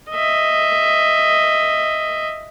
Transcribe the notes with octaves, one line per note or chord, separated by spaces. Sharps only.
D#5 E5